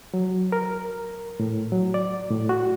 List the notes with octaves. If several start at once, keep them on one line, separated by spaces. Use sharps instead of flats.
F#3
A#4
A2
F#3
D5
A2
F#4